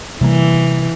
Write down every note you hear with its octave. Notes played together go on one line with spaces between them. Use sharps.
C3 E3 G3 A#3